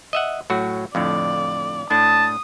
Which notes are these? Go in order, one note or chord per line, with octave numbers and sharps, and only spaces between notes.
D#5 E5 F#5
A2 F#3 F#4
F2 A2 D3 D5
A2 D4 A5 D#6